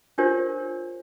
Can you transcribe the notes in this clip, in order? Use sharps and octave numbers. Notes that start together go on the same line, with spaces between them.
D4 F4 G4 A#4 C5 C#5